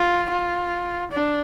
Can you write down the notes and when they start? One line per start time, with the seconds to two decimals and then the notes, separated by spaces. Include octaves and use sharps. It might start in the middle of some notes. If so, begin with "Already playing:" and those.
Already playing: F4
0.30 F4
1.12 D4